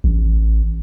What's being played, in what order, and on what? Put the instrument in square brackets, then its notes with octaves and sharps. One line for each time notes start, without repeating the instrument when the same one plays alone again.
[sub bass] A1